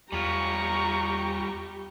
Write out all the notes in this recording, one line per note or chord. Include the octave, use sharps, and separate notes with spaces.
E2 G3 F4 G4 A#5 C#6